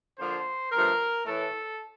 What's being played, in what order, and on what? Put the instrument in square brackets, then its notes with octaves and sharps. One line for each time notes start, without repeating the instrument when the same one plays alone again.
[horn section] D3 F3 A#3 C5
G2 F3 A3 A#4
A2 E3 A3 A4